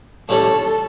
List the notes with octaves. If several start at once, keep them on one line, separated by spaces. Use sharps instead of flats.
A2 G3 C#4 A4